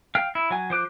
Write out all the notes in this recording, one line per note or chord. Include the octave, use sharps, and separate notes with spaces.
F5 G5 F6
E4
F#3 G#5
F3 C5 D6 F#6